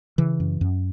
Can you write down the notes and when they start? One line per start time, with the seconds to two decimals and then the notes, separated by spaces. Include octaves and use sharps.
0.18 C#3 E3
0.40 F#2
0.61 F#2